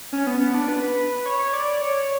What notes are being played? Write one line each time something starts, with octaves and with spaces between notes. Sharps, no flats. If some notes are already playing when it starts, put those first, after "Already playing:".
C#4
B3
B3
D4
B4
C#5
C#5
D5
C#5